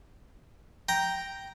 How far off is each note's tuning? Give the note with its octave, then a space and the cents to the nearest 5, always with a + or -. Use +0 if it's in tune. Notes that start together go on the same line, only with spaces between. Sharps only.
G5 -5 A#5 +0